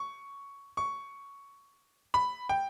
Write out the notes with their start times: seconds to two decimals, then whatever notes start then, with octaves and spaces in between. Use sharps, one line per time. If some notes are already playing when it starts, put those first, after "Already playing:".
Already playing: C#6
0.77 C#6
2.14 B5
2.49 G5